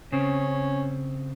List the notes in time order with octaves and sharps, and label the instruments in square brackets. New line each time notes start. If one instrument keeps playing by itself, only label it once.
[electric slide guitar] C#3 C4 [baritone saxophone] C#4